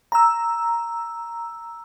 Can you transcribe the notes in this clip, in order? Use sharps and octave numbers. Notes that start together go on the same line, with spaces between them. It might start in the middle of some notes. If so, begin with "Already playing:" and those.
A#5 E6